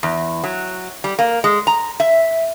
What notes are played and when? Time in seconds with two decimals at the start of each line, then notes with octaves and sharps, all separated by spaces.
0.03 E2
0.44 F#3
1.04 G3
1.19 A#3
1.44 G#3
1.67 A#5
2.00 E5